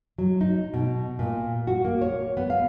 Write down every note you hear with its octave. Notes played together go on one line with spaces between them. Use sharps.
F#3
D#4
B2
A#2
F#4
A#3
C#5
B3
F5